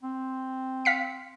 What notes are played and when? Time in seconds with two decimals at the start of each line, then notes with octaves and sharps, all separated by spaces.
0.03 C4
0.85 F5 B6 C#7